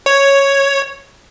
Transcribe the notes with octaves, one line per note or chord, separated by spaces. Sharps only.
C#5